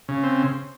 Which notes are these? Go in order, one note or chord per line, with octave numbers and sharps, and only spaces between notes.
C#3
C4